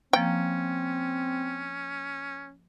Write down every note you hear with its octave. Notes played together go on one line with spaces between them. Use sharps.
F3 A#3 C4 C#4 G5